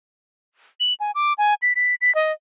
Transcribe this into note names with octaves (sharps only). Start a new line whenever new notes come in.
F#7
G#5
D6
G#5
B6
B6
B6
D#5